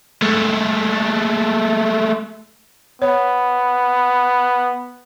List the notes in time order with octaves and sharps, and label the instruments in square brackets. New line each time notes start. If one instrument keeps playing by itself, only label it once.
[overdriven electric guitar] G#3 A3
[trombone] B3 [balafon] C#5